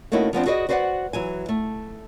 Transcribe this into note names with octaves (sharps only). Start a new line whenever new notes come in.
A3 A#3 C#4 D#4 E4 F#4
F3 B3 C4 D4
F#4 G#4 B4 D5 D#5
F#4 B4 C5 D5 E5 F#5
E3 F#3 G#5
A3